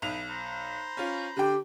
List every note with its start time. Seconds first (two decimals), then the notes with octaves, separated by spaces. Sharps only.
0.02 B1 D#4 E4 B4 F7
0.29 C5 A#5 B5
0.97 C#4 F4
1.37 D3 G4 G5